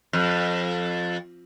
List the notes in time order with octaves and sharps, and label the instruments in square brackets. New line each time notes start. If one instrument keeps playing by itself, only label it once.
[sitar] F2